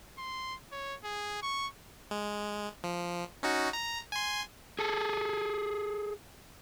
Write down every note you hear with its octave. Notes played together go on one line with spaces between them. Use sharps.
C6
C#5
G#4
C#6
G#3
F3
C#4 D#4 F#4
A#5
G#5 C6
G#4 A4